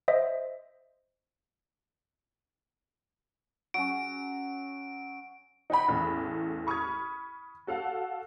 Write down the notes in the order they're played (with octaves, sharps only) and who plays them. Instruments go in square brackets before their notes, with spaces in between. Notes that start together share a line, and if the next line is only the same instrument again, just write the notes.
[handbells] C5 D#5 E5
[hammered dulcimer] F#3 C#4 [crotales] D7
[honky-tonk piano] D#4 F#5 G5 B5
A1 E2 A2
B5 C#6 D#6 F6 G#6
F#4 A4 F5 F#5